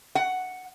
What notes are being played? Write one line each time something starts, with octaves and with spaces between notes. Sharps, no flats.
F#5